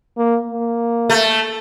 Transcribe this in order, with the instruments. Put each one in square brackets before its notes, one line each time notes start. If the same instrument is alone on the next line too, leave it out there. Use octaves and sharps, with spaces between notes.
[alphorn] A#3
A#3
[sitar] A3